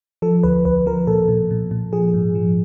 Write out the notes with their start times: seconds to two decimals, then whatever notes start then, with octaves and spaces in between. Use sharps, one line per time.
0.22 F3 A4
0.43 D2 B4
0.65 D2 B4
0.86 F3 A#4
1.07 A#2 A4
1.29 A#2
1.51 A#2
1.71 A#2
1.93 F3 G#4
2.14 G#2
2.35 F3